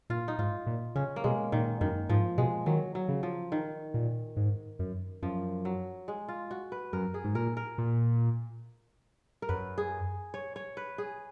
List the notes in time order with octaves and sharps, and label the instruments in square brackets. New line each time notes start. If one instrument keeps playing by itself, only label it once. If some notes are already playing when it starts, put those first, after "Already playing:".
[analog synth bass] A#2 [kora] F4
[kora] D#4
[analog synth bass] G#2 [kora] F4
[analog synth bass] A#2
[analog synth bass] C#3 [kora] C#4
[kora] A#3
[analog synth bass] B2 [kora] G#3
[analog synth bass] A#2 [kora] D#3
[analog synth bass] F#2 [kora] D#3
[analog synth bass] G#2 [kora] F3
[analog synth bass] B2 [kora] G#3
[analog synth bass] D#3 [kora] F#3
[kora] F#3
[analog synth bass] C#3
[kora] F3
D#3
[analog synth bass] A#2
G#2
F#2
[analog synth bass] F#2 [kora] F3
[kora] F#3
G#3
F4
F#4
B4
[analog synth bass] F#2 [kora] A#4
[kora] G#4
[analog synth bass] G#2
[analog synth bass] A#2 [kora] A#4
[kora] A#4
[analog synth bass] A#2
[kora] A#4
[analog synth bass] F#2 [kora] B4
[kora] G#4
C#5
C#5
B4
G#4